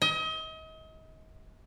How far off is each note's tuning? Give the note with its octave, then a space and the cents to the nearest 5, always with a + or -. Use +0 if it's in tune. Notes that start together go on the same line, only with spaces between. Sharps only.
D#5 +35